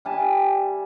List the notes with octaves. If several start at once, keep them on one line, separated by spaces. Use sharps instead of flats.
G3 E5 G#5 A5